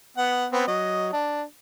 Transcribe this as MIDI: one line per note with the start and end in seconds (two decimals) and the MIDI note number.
0.17 0.46 59
0.17 0.46 78
0.52 0.66 59
0.52 0.66 60
0.67 1.11 54
0.67 1.11 75
1.13 1.42 62